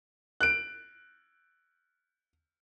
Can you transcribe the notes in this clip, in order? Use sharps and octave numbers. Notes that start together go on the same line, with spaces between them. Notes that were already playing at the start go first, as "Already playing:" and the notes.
F#6 D7